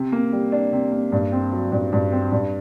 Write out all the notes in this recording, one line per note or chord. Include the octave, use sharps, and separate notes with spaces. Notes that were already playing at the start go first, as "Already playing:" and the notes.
Already playing: C3
A#3
G3
D4
C3
A#3
G2
C4
F#3
G2
G2
C4
G2